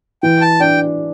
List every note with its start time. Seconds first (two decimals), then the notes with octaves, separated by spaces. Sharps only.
0.23 E3 G5
0.41 A5
0.60 D4 G5